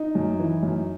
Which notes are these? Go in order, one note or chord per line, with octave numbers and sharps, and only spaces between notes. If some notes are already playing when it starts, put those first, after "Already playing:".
Already playing: D#4
F#2
E3
F#2